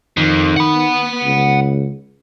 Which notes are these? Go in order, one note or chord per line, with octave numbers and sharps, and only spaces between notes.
F2 D#3
F#5 B5
C#2